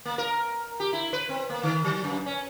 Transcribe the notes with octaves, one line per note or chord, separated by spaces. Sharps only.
A#3
A#4
G4
E4
B4
C4
A#3
D#3
F#3
F#2
C#4